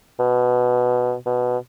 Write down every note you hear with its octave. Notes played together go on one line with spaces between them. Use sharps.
B2
B2